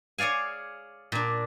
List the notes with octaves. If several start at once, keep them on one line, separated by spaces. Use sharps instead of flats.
G#4 C#5 D5 F5 G#5
A#2 D4